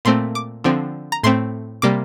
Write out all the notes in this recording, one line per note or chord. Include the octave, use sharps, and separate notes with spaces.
A#2 A3 C4 C6
D6
D3 F3 C4
A#5
A2 A3 C4 C6
C3 G3 A#3 D6